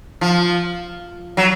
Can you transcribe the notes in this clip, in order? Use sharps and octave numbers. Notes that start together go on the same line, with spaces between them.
F3
F#3